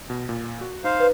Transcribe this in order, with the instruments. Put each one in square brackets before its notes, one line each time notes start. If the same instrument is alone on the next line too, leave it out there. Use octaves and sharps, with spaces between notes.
[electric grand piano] B2
A#2
F#4
[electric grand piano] D#4 [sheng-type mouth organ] C5 F5
[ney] B4